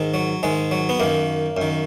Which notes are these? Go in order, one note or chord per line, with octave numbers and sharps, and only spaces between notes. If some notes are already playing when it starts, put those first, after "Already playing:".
Already playing: G#2 D#3
F#3
G#2 D#3 G#3
F#3
B3
F#2 D#3 A#3
F#2 D#3